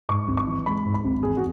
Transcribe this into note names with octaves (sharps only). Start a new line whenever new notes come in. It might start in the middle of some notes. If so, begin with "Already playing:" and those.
G#2 C#6
G#1
C#6
E3
G#3 B5
G#2
B5
G#1
E2 G#4
F#4